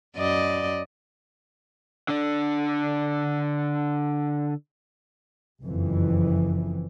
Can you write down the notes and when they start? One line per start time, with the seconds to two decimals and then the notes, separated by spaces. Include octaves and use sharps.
0.16 F#2 D5 D#5
2.08 D3 D4
5.62 F#1 F2 E3